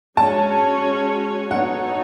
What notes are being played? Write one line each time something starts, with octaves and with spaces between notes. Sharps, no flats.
G#3 C#4 F#4 C#5 A5
B3 D#4 F#4 A4 C#5 F#5